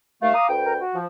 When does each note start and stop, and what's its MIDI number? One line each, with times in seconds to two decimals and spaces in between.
0.22 0.30 39
0.22 0.30 57
0.22 0.48 77
0.34 0.48 82
0.34 0.48 86
0.34 0.48 87
0.49 0.80 38
0.49 0.80 71
0.49 0.80 79
0.64 0.73 70
0.80 0.97 66
0.95 1.06 53